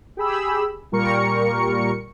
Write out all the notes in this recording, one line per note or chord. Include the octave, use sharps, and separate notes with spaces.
G4 G#4 B5 E6
A#2 G3 A#4 C#6 C#7